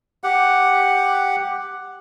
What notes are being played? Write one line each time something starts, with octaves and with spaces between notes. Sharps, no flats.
G4 F#5